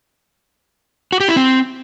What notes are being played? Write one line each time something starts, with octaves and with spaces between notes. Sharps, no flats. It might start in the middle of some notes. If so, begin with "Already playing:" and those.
F#4
G4
E4
C4